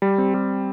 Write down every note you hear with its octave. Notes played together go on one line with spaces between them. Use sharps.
G3
C4
G3